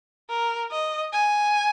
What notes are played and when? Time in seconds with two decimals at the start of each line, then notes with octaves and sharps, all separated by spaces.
0.30 A#4
0.71 D#5
1.13 G#5